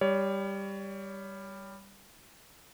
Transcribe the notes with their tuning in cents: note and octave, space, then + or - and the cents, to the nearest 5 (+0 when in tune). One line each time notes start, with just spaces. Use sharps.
G3 +10 C#5 +30